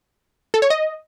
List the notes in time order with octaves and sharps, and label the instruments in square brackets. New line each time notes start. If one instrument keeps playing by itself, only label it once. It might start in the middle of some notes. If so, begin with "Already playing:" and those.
[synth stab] A4
C#5
D#5